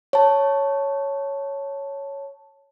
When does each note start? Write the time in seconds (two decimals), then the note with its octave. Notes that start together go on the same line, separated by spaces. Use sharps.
0.13 C#5 A5